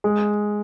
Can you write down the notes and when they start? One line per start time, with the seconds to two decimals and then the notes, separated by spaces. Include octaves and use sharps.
0.04 G#3